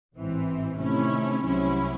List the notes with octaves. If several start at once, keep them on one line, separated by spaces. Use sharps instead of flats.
A1 G#2 E3 C4
C3 D#3 A3 C#4 E4
C2 C3 F#3 C#4 E4